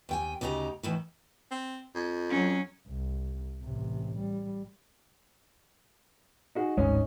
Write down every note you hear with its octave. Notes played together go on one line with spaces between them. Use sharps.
D#2 G5 G#5
D2 C#3 D#4 G4 A#5
A2 D#3 E3
C4
F2
F#3 C#4
C2
A1 C3
G3
D#4 F#4 G#4
D1 G#1 G#3 C#4 D#4